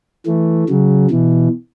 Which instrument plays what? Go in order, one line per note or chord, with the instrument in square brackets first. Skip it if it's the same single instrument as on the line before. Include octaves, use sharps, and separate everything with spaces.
[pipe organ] E3 A3
C#3 F#3
B2 E3